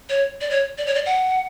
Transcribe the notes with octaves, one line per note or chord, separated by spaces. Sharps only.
C#5
D5
C#5
D5
C#5
D5
F#5